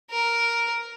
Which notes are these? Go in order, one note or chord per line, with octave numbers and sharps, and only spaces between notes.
A#4